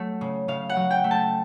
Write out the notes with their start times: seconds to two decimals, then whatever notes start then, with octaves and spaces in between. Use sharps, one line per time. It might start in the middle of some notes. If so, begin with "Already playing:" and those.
Already playing: F#3 A3
0.21 C#3
0.48 C#3 F5
0.69 F#5
0.76 F#3
0.91 G5
1.04 A3
1.11 A5